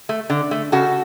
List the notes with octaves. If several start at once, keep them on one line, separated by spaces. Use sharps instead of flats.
A3
D3
A3
C#3 F#4 A4